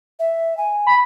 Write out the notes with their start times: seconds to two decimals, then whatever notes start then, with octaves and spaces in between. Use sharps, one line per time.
0.19 E5
0.57 G#5
0.87 B5